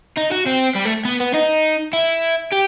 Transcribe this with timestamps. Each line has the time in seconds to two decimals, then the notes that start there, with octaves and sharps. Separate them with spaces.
0.17 D#4
0.31 F#4
0.46 C4
0.75 G3
0.85 A3
1.05 B3
1.20 B3
1.34 D#4
1.93 E4
2.52 G4